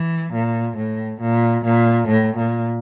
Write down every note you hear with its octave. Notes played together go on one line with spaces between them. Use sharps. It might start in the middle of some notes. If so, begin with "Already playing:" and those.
Already playing: E3
A#2
A2
A#2
A#2
A2
A#2